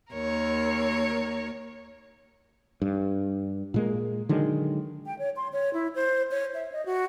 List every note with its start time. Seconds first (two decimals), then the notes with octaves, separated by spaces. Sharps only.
0.11 D#2 A#4 C#5
2.82 G2
3.74 A#2 G#3 A#3
4.29 D3 D#3 F#3 G#3
5.06 G5
5.19 C#5
5.36 C6
5.53 C#5
5.73 E4
5.95 C5
6.31 C#5
6.54 E5
6.72 D#5
6.86 F#4